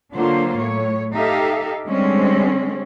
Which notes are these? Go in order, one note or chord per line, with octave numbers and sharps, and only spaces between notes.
D3 F#3 A#3 F4 C5
A2 C#5
D#4 G4 A4 E5 F5
D3 G3 G#3 C4 C#4